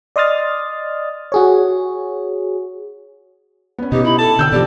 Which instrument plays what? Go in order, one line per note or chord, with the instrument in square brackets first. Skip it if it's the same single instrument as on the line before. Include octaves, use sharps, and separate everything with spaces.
[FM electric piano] D5 D#5 C6 D#6 F6 A6
F#4 G#4 C#5
[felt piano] B3 C#4
[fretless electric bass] B2 [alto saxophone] D#4 [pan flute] G4
[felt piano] E4 [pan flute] B5
[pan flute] A4 [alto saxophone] A5
[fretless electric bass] D3 [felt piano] G5 E6 G6
[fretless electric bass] B2 D3 F3 [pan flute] G4 [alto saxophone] D5